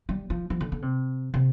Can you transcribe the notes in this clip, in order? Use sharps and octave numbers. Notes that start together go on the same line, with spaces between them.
G3
F3
F3
D3
D3
C3
C3